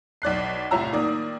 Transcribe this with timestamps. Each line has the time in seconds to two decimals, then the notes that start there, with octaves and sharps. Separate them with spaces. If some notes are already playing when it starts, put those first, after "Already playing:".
0.22 B1 D5 F#6 C7
0.71 C2 A2 F4 C#5 A#5 E6
0.92 D#3 A#3 D5 D#6